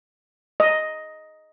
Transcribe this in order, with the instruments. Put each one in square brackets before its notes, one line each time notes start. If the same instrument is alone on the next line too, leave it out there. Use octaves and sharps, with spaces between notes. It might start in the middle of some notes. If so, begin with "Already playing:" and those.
[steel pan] D#5